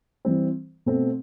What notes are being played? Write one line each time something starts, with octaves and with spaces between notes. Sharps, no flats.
E3 G3 C4
B2 A3 C4